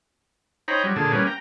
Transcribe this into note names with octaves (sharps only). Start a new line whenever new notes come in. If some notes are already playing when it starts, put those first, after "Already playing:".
D#4 C5 C#5 G5 A#5 B5
F#3 G3
A#2 D3 G#4 A5
G3 A#3 C#4 B4
G5 A#5